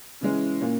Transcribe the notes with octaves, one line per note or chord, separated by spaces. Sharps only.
C#3 E3 G#3 C#4
A#2 A#3 C#4